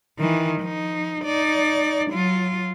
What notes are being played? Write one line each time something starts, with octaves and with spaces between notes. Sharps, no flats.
D#3 E3
F3 D#4
D#4 D5
F#3 F4